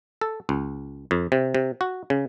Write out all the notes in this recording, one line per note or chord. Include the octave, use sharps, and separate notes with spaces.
A4
C#2
F2
C3
C3
F#4
C#3